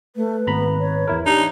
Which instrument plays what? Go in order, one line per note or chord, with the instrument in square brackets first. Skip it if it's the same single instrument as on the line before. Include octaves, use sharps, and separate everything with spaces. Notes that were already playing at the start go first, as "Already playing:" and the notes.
[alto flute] A3 [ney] B4
[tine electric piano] G#1 A#5 B5 [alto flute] B3
[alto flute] C#5
[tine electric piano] E2 E4 A#4
[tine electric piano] D4 [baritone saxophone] D#4 [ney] G4